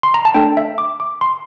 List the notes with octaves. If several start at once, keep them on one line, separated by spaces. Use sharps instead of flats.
C6
A#5
A5
A3 D4 A4 G5
E5
D6
D6
C6